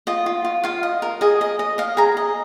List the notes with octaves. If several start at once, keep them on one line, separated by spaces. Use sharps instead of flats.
F4 D#5
F4
F4
F4 F5
D#5
A#4
G#4 D#5
D#5
D#5
D#5 F5
G#4 A#5
D#5